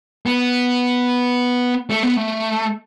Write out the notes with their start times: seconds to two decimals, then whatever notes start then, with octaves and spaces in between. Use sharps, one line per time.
0.26 B3
1.90 A3
2.03 B3
2.16 A3